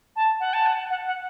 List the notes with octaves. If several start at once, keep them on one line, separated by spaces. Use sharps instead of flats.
A5
F#5
A5
F#5
F#5
F#5